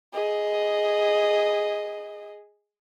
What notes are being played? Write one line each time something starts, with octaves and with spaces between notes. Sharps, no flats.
G#4 D#5